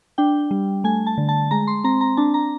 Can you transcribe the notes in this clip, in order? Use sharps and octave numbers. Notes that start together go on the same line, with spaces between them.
D4 G5
G3
A3 G#5
A5
D3
A5
G#3 A#5
C6
C4 A#5
A#5
D4 A5
A#5